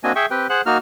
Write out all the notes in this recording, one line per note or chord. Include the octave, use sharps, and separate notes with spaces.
A#3 C4 D4 F#4 D#5 G#5
G#4 E5 G5 C#6
C4 G4 B4 G5
G#4 C5 F#5 F#6
A#3 D#4 F#4 F6